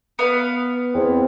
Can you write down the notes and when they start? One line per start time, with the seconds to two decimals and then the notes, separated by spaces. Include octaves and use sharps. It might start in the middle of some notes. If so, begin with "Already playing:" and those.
0.19 B3 F5
0.94 E2 C4